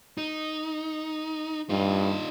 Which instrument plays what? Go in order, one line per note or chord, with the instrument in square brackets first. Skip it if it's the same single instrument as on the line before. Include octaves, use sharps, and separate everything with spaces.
[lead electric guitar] D#4
[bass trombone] G2 [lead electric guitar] D#4 F4